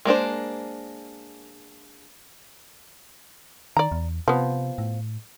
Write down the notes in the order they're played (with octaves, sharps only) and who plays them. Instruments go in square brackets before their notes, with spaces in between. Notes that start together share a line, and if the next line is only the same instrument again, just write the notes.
[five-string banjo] G#3 A#3 D4 C5
[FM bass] D#3 [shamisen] D5 A#5
[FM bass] E2
[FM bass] C3 [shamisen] F3 B3
[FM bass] A2